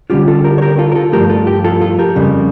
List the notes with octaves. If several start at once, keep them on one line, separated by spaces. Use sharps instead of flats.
D3 G3 C#4 F4 G4
F4 A4
G4 A#4
C#5
G4 A#4
F4 A4
A#4
F4 A4
G2 F3 A3 G4 A#4
F4 A4
G4
F4 A4
F4 A4
G4 A#4
F2 C#3 G3